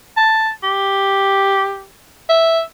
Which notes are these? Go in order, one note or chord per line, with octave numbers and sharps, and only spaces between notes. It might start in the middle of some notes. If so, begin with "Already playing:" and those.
A5
G4
E5